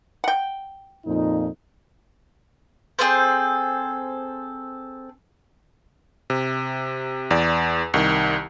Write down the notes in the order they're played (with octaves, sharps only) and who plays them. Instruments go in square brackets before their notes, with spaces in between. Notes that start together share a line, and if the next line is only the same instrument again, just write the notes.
[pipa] F#5 G5
[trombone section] F2 A#2 D#4
[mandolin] C4 G#4 A4 C5
[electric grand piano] C3
E2 D5
C2 D#3